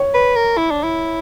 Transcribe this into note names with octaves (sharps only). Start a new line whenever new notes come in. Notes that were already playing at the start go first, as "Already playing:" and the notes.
Already playing: C#5
B4
A#4
E4
D4
E4